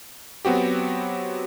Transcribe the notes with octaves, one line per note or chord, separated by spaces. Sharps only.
F#3 B3 C4 F#4 G4